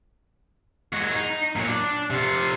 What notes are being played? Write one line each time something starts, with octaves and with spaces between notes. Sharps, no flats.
G#3 F#4
D#4
A#2 F#3
D4
C3 F4